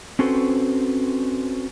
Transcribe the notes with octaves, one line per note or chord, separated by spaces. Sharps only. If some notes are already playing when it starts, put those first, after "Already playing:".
C4 C#4 F#4 A4 B4 C5